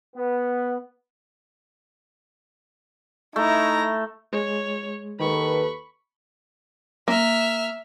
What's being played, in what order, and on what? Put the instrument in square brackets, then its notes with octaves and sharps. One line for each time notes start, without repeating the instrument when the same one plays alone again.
[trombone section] B3
[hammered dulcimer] A3 [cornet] D#4 [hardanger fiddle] E4 A#5
[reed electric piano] G#3 [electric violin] C#5
[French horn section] D#2 A4 B4 [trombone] D#3 [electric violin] B5 C#6
[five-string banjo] A#3 [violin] E5 F6